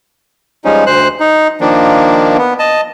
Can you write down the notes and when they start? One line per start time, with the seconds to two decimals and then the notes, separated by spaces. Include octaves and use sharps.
0.65 F3 G3 G#3 C#4 D#4
0.86 D2 C5 F#6
1.20 D#4
1.61 D#3 F3 A#3 D4
2.38 B3
2.59 D#5 A5